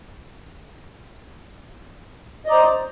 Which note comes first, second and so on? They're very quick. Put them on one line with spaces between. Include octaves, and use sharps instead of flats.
D#5 D5 A#5 C5